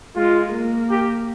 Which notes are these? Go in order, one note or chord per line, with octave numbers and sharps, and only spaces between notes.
G#3 F4
A#3
G4